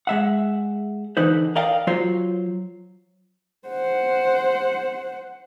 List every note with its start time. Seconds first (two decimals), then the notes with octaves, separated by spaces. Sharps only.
0.07 G#3 E5 F#5
1.17 D3 E3 D#4 B4 C5
1.56 A#4 D5 D#5 F5 G5
1.87 F#3 F4 C5 C#5
3.68 C5 F#5